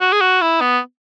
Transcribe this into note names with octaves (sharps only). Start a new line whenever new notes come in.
F#4
G#4
F#4
E4
B3